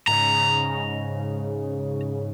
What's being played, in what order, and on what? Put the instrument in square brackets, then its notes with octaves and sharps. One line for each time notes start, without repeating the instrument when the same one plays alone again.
[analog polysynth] G#2 C#3 [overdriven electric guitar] A#5